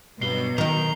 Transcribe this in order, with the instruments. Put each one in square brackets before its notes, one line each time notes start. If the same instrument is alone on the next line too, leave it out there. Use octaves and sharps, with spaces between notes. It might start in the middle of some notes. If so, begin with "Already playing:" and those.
[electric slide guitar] G2 [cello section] B2 F#3 [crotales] C7 G7
[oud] D#3 D#4 [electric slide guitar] A#5